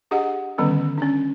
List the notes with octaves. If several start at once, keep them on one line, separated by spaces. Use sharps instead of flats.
D4 G4 G#4 D#5 F#5
D3 D#3 G3 B3 C#4
C#4 D4